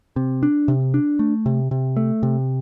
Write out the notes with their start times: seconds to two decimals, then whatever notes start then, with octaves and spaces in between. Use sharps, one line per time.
0.16 C3
0.43 D4
0.68 C3
0.94 D4
1.19 A3
1.46 C3
1.71 C3
1.97 A3
2.23 C3